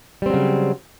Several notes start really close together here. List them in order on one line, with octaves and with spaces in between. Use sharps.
G3 C4 F#3 C#3